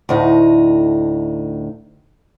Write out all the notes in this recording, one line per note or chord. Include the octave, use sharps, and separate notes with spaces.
D2 A2 D#4